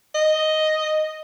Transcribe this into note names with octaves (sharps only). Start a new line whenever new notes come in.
D#5